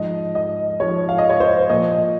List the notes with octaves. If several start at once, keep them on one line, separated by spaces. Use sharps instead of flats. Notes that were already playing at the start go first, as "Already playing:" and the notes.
Already playing: G#2 F3 D#5
D#5
G#2 F3 C#5
F5
D#5
C#5
C5
A#2 F3 D#5